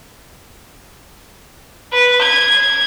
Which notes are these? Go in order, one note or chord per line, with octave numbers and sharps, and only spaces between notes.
B4
G#6